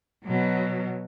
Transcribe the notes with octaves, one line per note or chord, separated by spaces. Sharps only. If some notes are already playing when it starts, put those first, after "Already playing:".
B2 F#3